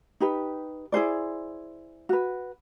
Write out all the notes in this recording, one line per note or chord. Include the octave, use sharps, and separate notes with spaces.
D#4 G4 B4
E4 G#4 C5 D5
F#4 B4